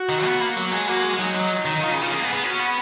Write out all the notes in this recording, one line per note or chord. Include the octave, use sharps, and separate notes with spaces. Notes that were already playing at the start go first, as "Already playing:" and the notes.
Already playing: F#4
D#3
B3
A#3
F#3 F#4
G#3
A#3 F#4
G#3
G#3
F#3 D#4
F#3
D#3
D#3 F4
C#3
D#3
G#3
A#3 G#4
B3
B3
C#4 F#4
B3